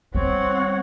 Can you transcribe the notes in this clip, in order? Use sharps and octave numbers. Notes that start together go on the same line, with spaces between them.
G3 C4 C#5 F#5